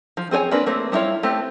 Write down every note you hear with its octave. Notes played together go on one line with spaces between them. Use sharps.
F3
C4 G#4 C5 C#5 G#5
A#3 C4 D4 B4
A3 A#3 C4
G3 B3 E4 F4 C#5
A3 B3 C4 G4